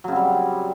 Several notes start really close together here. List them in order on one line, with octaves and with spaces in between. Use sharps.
F#3 C#3 C4 G3